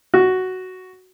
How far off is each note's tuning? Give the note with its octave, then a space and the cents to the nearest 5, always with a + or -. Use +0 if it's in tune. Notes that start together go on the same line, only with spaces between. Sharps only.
F#4 +5